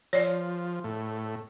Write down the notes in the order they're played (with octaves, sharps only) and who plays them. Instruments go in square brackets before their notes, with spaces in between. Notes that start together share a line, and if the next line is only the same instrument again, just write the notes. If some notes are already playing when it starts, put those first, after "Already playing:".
[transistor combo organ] F3 [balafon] C#5 D5
[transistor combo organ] A2